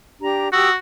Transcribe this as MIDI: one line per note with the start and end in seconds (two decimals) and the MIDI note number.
0.21 0.49 62
0.21 0.49 67
0.21 0.49 82
0.53 0.75 66
0.53 0.69 67
0.53 0.69 87
0.53 0.69 88